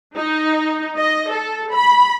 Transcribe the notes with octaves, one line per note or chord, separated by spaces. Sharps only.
D#4
D#5
A4
B5